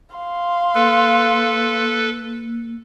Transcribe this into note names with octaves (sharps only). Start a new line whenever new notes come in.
F5 C6
A#3 A4 B4